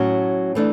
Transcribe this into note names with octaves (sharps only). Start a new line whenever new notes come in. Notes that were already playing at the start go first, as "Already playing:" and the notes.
Already playing: A2 F#3 C#4 F#4
E3 A3 D4